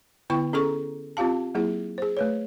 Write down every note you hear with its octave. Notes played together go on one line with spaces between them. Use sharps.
D3 B3 E4 G5 C#6
C#4 G#4 A4 A#5 C#6
C4 F4 G4 F5 A5
F#3 A#3 E4 G#4
G#4 C5
A3 B4 C#5